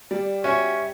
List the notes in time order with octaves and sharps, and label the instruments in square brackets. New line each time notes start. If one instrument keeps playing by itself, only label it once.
[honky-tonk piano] G3 [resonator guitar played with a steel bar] D5
[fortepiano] C#4 [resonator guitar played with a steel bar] F#4 C#5 [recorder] E5